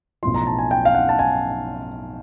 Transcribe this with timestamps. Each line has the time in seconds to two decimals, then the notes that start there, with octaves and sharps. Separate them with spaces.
0.23 B1 A2 F3 C6
0.34 A#5
0.47 A5
0.59 G#5
0.71 G5
0.85 F5
0.95 F#5
1.09 A5
1.19 G#5